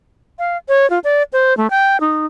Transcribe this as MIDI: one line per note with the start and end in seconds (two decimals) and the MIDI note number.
0.39 0.57 77
0.68 0.89 73
0.90 0.99 65
1.04 1.23 74
1.33 1.56 72
1.57 1.70 57
1.70 2.00 79
2.01 2.26 63